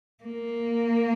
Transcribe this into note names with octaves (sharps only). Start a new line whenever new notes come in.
A#3